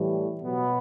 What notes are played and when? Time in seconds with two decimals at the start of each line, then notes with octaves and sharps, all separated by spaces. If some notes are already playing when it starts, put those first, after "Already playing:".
Already playing: A2 E3 G3
0.40 B2 F#3 B3